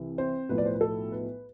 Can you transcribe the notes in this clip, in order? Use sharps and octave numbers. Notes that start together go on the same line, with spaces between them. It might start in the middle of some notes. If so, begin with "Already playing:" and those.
Already playing: C2 C3 E3
C4 C5
B1 A2 F3 B4
D5
C5
B4
A4
B4